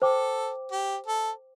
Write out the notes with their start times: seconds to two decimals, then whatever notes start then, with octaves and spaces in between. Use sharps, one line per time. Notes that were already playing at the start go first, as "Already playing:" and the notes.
0.01 A4 C5 G5 D6
0.72 G4
1.06 A4